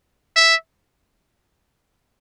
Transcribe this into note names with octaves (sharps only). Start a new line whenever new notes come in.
E5